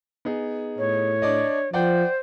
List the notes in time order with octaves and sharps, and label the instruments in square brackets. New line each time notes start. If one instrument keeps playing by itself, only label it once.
[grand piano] B3 D#4 G#4
[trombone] A2 [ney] C#5
[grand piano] D4 D5 D#5
[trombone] F3 [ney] C5 [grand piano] D5 F#5 G5